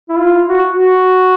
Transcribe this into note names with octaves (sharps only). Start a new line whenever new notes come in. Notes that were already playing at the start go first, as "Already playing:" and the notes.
E4
F4
F#4
F#4